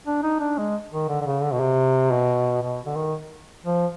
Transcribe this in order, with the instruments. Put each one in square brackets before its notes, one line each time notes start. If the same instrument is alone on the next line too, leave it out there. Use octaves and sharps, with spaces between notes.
[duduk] D4
D#4
D4
G#3
D#3
D3
D3
C#3
D3
B2
C3
B2
B2
D3
D#3
F3